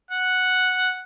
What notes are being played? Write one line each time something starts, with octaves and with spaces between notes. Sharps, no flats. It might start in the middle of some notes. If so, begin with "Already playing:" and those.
F#5